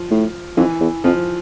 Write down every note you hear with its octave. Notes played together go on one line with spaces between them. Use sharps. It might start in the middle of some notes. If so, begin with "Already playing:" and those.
Already playing: F3
A2
F2 E3
E2
F2 F3